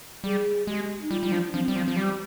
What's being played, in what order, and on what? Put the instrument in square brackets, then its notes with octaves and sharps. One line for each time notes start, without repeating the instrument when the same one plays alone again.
[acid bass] G3 [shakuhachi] G#4
[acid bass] G#3 [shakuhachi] G4
[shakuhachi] D#4
[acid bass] G3 [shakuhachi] F4
[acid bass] G3
[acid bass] F3 [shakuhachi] D4
[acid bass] F3 [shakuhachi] C4
[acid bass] G3
[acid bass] F3 [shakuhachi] C4
[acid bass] F3
[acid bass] G3 [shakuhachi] G4